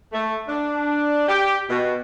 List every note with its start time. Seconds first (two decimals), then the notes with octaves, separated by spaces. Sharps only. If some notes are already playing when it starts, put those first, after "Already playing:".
0.12 A3
0.48 D4
1.28 G4
1.70 B2